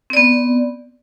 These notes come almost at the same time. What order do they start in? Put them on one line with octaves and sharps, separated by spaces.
C4 D5 B3